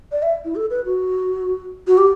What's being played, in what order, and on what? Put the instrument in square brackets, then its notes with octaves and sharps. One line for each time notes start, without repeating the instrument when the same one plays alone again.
[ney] D5
E5
E4
A4
B4
F#4
F#4
G4